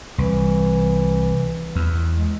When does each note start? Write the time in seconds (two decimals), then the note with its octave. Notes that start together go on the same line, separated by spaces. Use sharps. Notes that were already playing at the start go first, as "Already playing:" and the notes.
0.18 C2 E3
1.76 E2
2.16 G#3